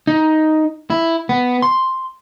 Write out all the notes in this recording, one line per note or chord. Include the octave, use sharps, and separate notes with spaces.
D#4
E4
B3
C6